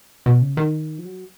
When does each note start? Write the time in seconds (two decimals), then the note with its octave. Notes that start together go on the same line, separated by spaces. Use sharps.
0.26 B2
0.42 C#3
0.57 D#3
0.98 F3
1.05 F#3